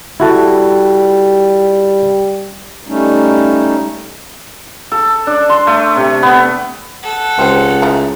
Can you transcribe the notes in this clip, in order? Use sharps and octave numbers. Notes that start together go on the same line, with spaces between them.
G3 E4 F#4 A4
G3 A3 C#4 D#4
A4
D4
C6
A3
C3
B3
A4 F#5
C#2 C4 G4 C5
A3 E4 A#5